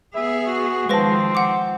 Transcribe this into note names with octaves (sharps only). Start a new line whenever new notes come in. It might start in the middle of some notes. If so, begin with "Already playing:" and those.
B3 G#4 E5
F#4
D#3 F3 G#3 C4 B4 C5 A5 A#6
F#5 D6